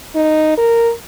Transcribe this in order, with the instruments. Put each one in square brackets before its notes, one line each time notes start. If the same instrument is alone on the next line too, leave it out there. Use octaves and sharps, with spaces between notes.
[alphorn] D#4
A#4